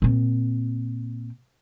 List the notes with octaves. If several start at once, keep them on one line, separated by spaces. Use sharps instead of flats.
A#2 C4